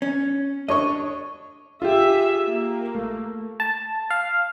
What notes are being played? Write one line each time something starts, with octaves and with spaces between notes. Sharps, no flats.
C#4
D4 C#5 D#5 C#6
F4 G4 G#4 E5
A#3
A3
A5
F5